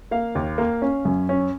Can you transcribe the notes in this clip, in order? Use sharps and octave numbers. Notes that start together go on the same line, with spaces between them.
A#3 F5
D#2
A#3
C#4
F#2
C#4